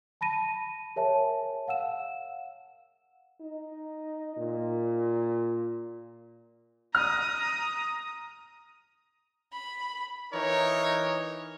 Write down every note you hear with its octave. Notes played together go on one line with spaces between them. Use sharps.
A5 B5 A#6 D#7
G#4 A#4 C#5 E5 G#5 A5
F5 F#5 E6 E7
D#4
A#2
A#5 D#6 F6
B5
E3 D#4 A#4 C#5